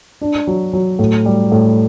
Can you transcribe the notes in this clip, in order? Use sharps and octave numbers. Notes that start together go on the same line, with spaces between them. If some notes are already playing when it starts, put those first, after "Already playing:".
D4
F#3
F#3
A2
G3
A2